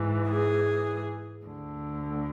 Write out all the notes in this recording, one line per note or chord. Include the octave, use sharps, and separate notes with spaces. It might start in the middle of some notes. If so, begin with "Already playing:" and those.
Already playing: G#2 E3
G#4
D2 D3